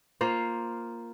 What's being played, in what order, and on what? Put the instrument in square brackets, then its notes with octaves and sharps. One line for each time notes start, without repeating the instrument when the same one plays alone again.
[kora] A#3 F4 C5